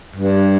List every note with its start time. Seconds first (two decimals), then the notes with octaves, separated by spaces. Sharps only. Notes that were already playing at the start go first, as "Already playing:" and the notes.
0.16 G2